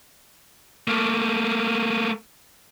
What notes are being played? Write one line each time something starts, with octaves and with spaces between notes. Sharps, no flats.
A3 A#3